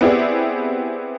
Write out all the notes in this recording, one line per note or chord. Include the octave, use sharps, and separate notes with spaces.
B3 C4 E4 G4 G#4 D5